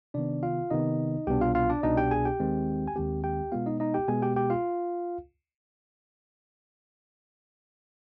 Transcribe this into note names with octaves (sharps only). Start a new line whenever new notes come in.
C3 D#3 B3 D4 D5
F4 F5
C3 D#3 B3 D#4 D#5
C2 B2 B3 D4 G4 G5
F4 F5
F4 F5
D4 D5
C2 B2 B3 D4 D#4 D#5
G4 G5
G#4 G#5
G4 G5
D#2 D#3 G#3 C4
G#5
D#2 D#3 G#3 C4 G4 G5
G4 G5
B2 G#3 B3 F4 F5
D#4 D#5
D#4 D#5
G4 G5
B2 G#3 B3 G#4 G#5
G4 G5
G4 G5
F4 F5